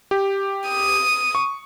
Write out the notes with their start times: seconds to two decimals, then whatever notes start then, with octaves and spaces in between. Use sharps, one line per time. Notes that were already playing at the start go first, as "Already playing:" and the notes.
0.11 G4
0.69 D#6
1.35 C#6